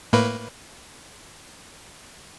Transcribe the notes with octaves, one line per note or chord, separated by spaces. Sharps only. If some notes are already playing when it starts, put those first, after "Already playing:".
A2 A#3 B4